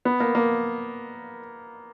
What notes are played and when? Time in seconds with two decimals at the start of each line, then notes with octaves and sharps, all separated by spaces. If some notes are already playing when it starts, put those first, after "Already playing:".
0.05 B3
0.20 A#3
0.35 A#3